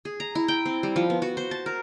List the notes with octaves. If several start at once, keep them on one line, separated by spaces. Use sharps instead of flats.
G#4
A#5
E4
G5
C4
G3
F3
B3
F#4
C5
A5
A#4